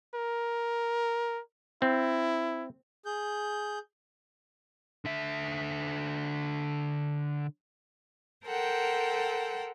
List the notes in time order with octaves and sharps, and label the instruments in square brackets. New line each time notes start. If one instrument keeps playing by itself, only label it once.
[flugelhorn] A#4
[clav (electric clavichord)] C4 [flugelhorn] E4
[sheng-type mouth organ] G#4 G6
[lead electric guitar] D3 E5
[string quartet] A4 A#4 C5 F#5 G5